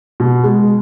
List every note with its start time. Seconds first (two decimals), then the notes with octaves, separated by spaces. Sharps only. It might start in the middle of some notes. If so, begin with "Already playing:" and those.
0.20 B2
0.43 G#3